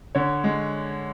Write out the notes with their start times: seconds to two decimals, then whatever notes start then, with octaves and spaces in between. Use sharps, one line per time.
0.15 D3 C#5
0.44 G#3